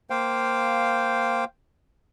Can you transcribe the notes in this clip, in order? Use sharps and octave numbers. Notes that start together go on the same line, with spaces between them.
A#3 C5 F5 G5